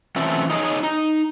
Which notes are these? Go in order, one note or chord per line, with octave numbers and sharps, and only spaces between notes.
E3 F#3 A3 C4 C#4 F4
D#4 E4 G#4 A4 C#5 D#5
D#4